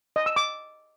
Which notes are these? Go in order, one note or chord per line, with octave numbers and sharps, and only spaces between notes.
D#5
E6
D6